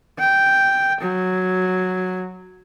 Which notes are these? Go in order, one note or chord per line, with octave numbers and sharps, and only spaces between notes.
G5
F#3